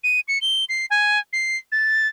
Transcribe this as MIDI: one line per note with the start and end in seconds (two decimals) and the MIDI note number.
0.04 0.20 99
0.28 0.38 97
0.41 0.65 103
0.69 0.86 96
0.90 1.19 80
1.33 1.57 96
1.72 2.07 93